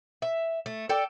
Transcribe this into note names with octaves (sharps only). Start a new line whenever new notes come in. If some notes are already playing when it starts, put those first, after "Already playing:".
E5
A3
A4 D5 G5